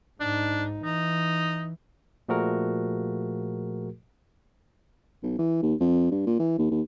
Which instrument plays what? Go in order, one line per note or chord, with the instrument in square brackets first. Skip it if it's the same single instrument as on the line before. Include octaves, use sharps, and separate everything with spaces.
[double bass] G#2 D#4 [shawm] D4
[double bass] E3 [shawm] D#4
[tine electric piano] A#2 F3 A3 F#4 G#4 A#4
[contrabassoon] B1
E3
D#2
F2
G2
A#2
E3
D#2
D#2